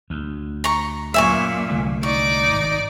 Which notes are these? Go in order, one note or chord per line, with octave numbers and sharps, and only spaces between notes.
D2
A#5 C#6
F#2 A#2 E5 G#5 C#6
C2 D3 A3
D#4 D5 C#6 D6
G#1